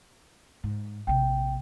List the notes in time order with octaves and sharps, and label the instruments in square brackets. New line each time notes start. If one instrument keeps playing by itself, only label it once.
[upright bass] G#2
[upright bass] A#1 C3 [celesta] G5